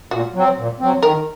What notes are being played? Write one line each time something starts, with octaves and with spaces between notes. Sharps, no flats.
A#2 F#4
F#3 C4
A#2
F#3 C4
D#3 A#4